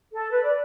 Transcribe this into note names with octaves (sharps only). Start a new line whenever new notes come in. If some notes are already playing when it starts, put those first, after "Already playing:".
A4
B4
D5